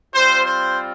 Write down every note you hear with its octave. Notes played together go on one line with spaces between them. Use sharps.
G3 C4 F4 C5
C5